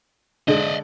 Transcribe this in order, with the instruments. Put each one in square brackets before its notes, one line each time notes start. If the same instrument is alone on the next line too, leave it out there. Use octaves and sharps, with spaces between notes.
[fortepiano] D3 G#3 [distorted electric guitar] D5 D#5